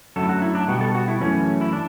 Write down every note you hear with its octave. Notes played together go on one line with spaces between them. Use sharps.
F#2 D3 F#3 A3 A4
E4
F#4
E4
D4
B2 G3 B3 F#4
A4
F#4
E4
F#2 E3 A3 C#4
E4
D4